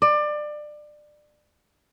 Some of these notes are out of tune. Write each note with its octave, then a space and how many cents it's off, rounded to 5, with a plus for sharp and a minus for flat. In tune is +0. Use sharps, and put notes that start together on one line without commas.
D5 +25